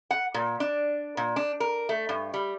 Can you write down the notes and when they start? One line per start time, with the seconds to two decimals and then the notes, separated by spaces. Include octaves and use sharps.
0.11 F#5
0.34 A#2
0.60 D4
1.17 A#2
1.36 D4
1.60 A#4
1.89 A3
2.09 G2
2.34 G3